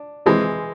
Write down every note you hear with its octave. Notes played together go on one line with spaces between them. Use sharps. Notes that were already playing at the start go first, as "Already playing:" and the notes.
Already playing: D4
E3 G#3 C4